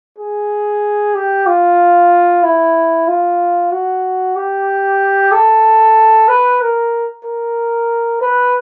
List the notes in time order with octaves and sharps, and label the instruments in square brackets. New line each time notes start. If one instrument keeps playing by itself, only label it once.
[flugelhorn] G#4
G4
F4
E4
F4
F#4
G4
A4
B4
A#4
A#4
B4